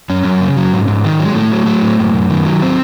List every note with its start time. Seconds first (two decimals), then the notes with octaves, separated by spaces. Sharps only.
0.09 F#2 C#4
0.25 F#2
0.41 C#3
0.57 F#3
0.73 G#2
0.88 G#2
1.05 D#3
1.20 F#3 G#3
1.35 A2 A3
1.52 F#3
1.66 F#3
1.82 A2
1.99 F#2
2.14 F#2
2.30 D#3
2.45 F#3
2.62 C4